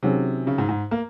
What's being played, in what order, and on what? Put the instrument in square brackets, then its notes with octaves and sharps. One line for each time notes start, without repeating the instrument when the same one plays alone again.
[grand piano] C3 [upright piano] D#3 F#3 C#4 G#4
[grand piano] C#3
G#2
G#2
A#3